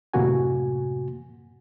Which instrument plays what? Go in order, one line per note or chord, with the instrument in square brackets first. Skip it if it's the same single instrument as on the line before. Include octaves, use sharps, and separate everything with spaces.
[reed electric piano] F#2 A2 C3 A#3 F#4 G#5